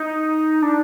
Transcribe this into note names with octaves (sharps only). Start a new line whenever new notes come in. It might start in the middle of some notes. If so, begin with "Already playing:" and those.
Already playing: D#4
D4